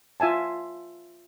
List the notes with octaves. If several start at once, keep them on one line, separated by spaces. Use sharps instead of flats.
F4 E5 G#5 A5